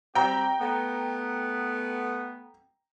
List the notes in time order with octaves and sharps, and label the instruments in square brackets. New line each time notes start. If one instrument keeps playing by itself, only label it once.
[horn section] G3 C4 G4 [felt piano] G5 A#5
[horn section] A3 B3